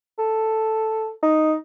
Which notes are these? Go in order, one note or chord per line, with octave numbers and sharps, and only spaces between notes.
A4
D#4